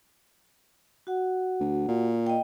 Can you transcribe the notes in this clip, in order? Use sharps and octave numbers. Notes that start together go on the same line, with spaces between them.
F#4 F#5
D2
A#2
D#5 G5